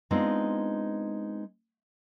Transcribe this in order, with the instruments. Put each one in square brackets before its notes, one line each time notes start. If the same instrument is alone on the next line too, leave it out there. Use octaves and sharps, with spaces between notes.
[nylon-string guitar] G#3 B3 C4 D4 D#4 F4